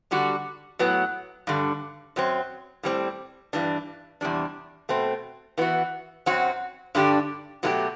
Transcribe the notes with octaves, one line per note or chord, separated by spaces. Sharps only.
D3 G3 D4 F#4
A2 F#3 B3
G2 D3 G3
F#2 F#3 C4
A2 G3 C4
G2 E3 G3 D4
E2 C3 G3 D4
B2 A3 C4
E3 B3 F#4
F#2 F#3 C4 F#4
G2 D3 G3 D4 G4
B2 F#3 A3 E4 G4